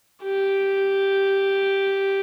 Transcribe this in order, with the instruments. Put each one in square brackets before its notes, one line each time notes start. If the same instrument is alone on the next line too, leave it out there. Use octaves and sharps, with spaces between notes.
[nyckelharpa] G4